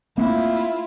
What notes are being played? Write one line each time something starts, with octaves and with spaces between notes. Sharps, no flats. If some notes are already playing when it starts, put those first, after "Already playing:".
A3 A#3 C4 E4 F4